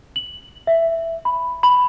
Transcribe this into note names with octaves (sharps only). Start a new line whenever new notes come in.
F#7
E5
B5
B5